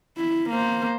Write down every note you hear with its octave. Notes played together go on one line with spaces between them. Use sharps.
E4
A#3 C5